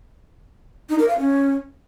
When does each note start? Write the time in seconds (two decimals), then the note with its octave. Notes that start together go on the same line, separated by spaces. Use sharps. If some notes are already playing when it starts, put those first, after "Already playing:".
0.89 D#4
0.99 A#4
1.08 F5
1.18 C#4